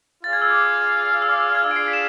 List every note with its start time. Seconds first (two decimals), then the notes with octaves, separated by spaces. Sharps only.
0.24 F4 G#4 D5 F5 A6
0.33 G#6
0.42 E6
0.50 D6
1.22 E6
1.29 D6
1.38 E6
1.46 F6
1.55 G#6
1.64 D4 F4 G#4 D5 F5 E6
1.71 D7
1.76 C7
1.88 B6
1.93 E7